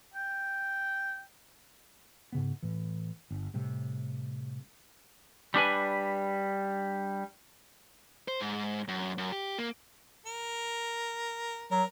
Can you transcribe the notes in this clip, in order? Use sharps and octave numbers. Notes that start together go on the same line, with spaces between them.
G5
G#2 C#3 B3
A2 E3
G1
A2 C3 G3
G3 D4 B4 G#5
C5
G#2
F#2
F#2
G4
A#3
A#4
F#3 A#4